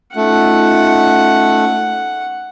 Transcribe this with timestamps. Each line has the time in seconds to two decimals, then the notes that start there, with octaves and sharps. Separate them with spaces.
0.16 A3 C#4 D#4 F4 F#5